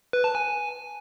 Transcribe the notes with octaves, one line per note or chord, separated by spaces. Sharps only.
B4
A5
G#5